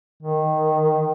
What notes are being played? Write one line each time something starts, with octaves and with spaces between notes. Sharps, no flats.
D#3